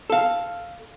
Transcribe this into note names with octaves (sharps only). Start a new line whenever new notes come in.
A4 F5